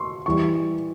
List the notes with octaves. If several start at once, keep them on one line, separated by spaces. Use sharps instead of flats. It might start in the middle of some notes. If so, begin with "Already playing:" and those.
Already playing: C6 C#6
E3 G3 C#6